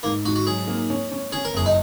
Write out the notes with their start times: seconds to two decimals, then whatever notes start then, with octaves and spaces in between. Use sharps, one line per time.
0.03 G#2 A#3
0.25 G#2 F#4
0.36 F#4
0.47 F#3 G#4
0.68 A#3
0.90 C#4
1.12 C#4
1.32 C#4 G#4
1.45 A#4
1.54 F#1 G#4
1.66 D#4